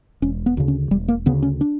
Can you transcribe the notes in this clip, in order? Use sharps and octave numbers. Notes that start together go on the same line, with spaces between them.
E1 C#4
B3
D2 C#3
C#4
E1 G3
A#3
D2 C#3 B3
C#4
D4